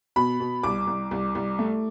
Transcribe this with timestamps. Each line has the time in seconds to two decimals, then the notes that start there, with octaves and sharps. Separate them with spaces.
0.16 B2 B5
0.40 B2
0.63 C2 D6
0.87 C2
1.11 C2
1.35 C2
1.59 A3